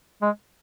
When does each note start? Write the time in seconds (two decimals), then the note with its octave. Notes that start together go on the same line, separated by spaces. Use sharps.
0.22 G#3